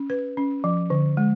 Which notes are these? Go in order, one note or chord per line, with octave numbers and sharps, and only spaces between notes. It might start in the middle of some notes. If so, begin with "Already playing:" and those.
Already playing: C#4
B4
C#4
F3
D3
G#3